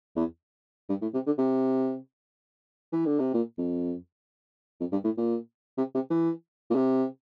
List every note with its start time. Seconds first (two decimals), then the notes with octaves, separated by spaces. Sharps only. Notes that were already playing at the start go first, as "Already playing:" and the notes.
0.16 E2
0.89 G2
1.02 A2
1.14 C3
1.26 D3
1.38 C3
2.92 E3
3.06 D3
3.20 C3
3.34 A#2
3.58 F2
4.80 F2
4.92 G2
5.04 A2
5.18 A#2
5.78 C3
5.95 C3
6.10 E3
6.71 A#2
6.76 C3